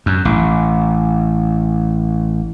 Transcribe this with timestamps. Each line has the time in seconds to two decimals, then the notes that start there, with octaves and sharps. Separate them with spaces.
0.06 F#2
0.25 A1